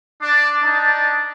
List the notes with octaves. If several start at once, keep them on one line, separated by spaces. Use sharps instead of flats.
D4 D5 A5 D6
D4 D#4 A5